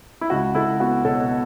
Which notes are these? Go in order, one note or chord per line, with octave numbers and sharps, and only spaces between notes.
E4
C#2 F#4
C#2 E4 A4
B3 F#4
B2 A4 C#5